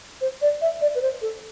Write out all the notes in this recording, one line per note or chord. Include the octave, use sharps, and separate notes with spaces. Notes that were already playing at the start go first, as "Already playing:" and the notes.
C5
D5
E5
D5
B4
C5
A4